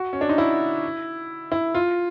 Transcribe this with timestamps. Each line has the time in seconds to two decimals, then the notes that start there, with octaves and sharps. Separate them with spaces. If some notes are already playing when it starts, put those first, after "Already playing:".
Already playing: F#4
0.13 C#4
0.21 D4
0.29 D#4
0.38 E4
1.52 E4
1.75 F4